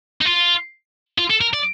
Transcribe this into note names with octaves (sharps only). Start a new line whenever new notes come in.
D#4
F4
F4
A4
A#4
D5